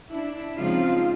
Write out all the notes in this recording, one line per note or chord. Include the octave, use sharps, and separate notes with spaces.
D4 E4
C#3 F3 G#3 C4 D#4 F4